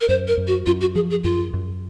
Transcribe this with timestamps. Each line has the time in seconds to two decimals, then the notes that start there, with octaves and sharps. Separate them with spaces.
0.01 A#4
0.09 F#2 C5
0.28 A#4
0.37 F#2
0.47 F#4
0.66 F#2 F4
0.81 F#4
0.95 F3 G#4
1.10 G#4
1.24 F#2 F4
1.53 F#2